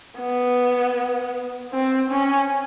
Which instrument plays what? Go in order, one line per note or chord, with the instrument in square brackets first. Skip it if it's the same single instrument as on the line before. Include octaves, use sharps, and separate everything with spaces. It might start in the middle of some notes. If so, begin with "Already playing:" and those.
[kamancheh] B3
C4
C#4